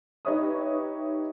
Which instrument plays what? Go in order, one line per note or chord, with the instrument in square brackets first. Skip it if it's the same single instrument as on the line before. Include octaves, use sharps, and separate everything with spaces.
[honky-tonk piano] D#4 G4 B4 C#5 E5 D#6